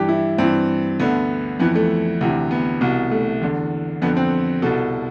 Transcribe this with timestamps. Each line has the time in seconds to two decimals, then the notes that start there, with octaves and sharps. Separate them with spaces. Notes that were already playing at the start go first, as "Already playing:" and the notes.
Already playing: G2 E3 G4
0.09 E4
0.38 G2 E3 C4
1.00 D2 D3 B3
1.59 F2 E3 B3
1.75 A3
2.21 D2 C3 E3
2.51 B3
2.81 C2 B2
3.11 A3
3.42 E2 D3
4.02 F2 D3 B3
4.17 C4
4.62 C2 B2 A4